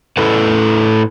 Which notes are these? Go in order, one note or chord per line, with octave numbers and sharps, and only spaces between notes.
A2 E4 A4 B4 F#5